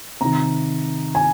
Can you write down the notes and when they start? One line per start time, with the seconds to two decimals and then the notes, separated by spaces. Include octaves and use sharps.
0.21 C3 D#3 A#5
1.15 G#5